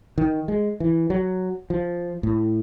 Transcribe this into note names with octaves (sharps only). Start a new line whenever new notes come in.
D#3
G#3
E3
F#3
F3
A2